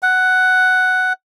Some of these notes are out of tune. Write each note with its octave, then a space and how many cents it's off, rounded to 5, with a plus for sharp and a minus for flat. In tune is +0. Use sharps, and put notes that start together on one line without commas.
F#5 +5